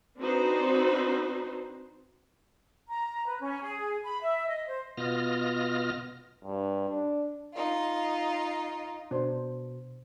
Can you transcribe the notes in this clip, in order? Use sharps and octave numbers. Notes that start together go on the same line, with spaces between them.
C4 D4 D#4 F#4 B4 C5
A#5
B4
C#4
G#4
B5
E5
D#5
C5
B2 B3 F4 D#5 F6 A#6
G2
D4
D#4 F4
B2 D4 C5